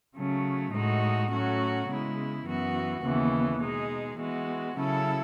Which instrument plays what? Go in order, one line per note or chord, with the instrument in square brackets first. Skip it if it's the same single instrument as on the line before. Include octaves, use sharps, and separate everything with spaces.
[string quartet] C#3 F#3 A3 C#4
A2 G#3 D#4 F#4
A2 F#3 A3 C#4 F#4
C#3 G#3 B3 E4
F#2 E3 B3 F#4
D#2 C#3 E3 B3
B2 G#3 D#4 G#4
E3 G#3 B3 F#4
C#3 F#3 C#4 E4 A4